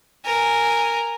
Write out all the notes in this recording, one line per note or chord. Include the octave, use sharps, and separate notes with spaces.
A#4 G#5